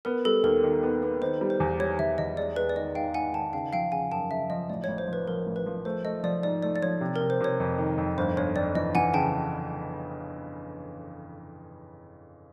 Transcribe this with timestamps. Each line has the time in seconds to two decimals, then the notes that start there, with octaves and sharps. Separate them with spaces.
0.05 B3 A#4
0.25 G3 A4
0.44 D#2 A#4
0.63 D#3
0.83 B3
1.03 B3
1.22 D#3 C5
1.41 G3
1.50 C5
1.60 E2
1.80 G3 C#5
1.99 E2 E5
2.18 E2 D#5
2.37 G#3 D5
2.56 G#3 B4
2.69 D5
2.75 D#3 D#5
2.95 G#2 F5 G5
3.14 G#2 F#5 G#5
3.34 D#3 G5 A5
3.53 C#3 F5 G5
3.73 F3 F5 G5
3.92 C#3 F#5 G#5
4.11 F#2 G5 A5
4.30 C#3 E5
4.50 F3 D#5
4.70 A1 D5
4.84 C#5
4.88 A1
4.98 C5
5.07 F3
5.13 B4
5.28 F3 A#4
5.47 A1
5.56 B4
5.66 F3
5.85 A3 C5
6.04 A3 D#5
6.23 F3 D5
6.43 G#2 D5
6.63 A3 D5
6.76 D5
6.82 F3 C#5
7.01 C3
7.16 A#4
7.20 C3
7.30 C5
7.41 C3 C#5
7.60 F2
7.78 D#3
7.98 F2
8.18 G1 C5
8.36 G1 C#5
8.55 F2 D5
8.75 E3 D#5
8.95 E3 F#5 G#5
9.14 C#3 G5 A5